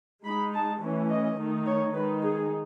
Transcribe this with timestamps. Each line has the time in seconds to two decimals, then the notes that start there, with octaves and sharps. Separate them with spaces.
0.25 G#3 D#4 B5
0.54 A5
0.82 E3 A3 C#4
1.10 D#5
1.39 D#3 A3 D#4
1.66 C#5
1.94 D#3 G#3 D#4 B4
2.23 G#4